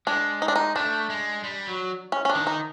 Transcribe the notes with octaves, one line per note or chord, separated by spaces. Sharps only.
G#3 D4
D#4
D4
D#4
A3 D4
G#3
G3
F#3
C#4
C#4
D4
D#3
D#4